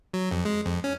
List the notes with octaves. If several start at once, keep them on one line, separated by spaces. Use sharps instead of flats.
F#3
F2
G#3
F2
C#4